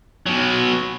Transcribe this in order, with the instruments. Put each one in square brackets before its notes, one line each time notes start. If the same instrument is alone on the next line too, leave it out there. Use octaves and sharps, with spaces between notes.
[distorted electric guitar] B2 F#3